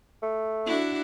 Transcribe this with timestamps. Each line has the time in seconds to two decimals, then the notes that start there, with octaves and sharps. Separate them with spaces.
0.23 A3
0.66 D4 E4 F#4